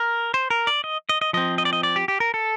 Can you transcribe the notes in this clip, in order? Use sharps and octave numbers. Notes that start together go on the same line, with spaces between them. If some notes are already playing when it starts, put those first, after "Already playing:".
Already playing: A#4
C5
A#4
D5
D#5
D#5
D#5
F3 C4 D#5
D#5
D5
D#5
D5
G4
G4
A#4
A4